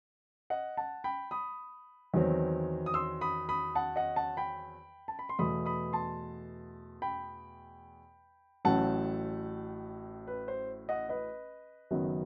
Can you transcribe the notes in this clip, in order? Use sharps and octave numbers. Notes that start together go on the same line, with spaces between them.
D#5 F#5
F#5 A5
G5 B5
B5 D#6
E2 D#3 F#3 C4
D#6
C6 E6
B5 D#6
B5 D#6
F#5 A5
D#5 F#5
F#5 A5
G5 B5
A5
B5
C6
E2 B2 A3 B5 D#6
B5 D#6
A5 C6
G5 B5
A1 A2 F#3 F#5 A5
B4
C5
D#5 F#5
B4 D#5
F#1 F#2 D#3 F#3 B3